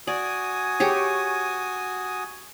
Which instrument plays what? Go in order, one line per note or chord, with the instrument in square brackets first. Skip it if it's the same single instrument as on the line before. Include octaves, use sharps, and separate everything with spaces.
[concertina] F#4 G#5 D#6 [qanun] D5
[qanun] G4 G#4 C#5